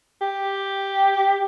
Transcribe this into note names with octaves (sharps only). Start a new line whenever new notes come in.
G4